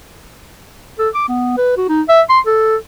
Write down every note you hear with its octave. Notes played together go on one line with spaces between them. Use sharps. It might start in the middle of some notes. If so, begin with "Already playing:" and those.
A4
D6
B3
B4
F#4
D#4
E5
C6
A4